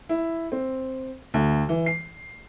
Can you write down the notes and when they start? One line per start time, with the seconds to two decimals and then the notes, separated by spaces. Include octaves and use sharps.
0.09 E4
0.52 C4
1.34 D2
1.69 E3
1.86 C7